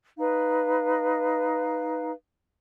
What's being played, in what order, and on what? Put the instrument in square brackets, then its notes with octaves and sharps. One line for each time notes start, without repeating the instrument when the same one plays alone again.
[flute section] D#4 B4 F5